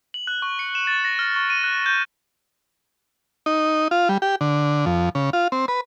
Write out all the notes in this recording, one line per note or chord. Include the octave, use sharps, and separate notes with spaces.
F#7
F#6
C#6
C#7
E7
A6
A#6
F6
C#6
D#7
F#6
G6
D#4
F4
G3
G4
D3
F2
C#3
F4
C4
B4